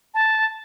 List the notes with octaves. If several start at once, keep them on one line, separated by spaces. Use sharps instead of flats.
A5